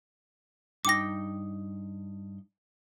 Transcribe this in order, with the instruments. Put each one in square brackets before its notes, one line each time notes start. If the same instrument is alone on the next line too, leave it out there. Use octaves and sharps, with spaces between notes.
[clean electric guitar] G2 D#4 G5 [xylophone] D6 A#6